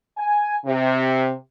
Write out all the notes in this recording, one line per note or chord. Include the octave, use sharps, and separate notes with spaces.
G#5
C3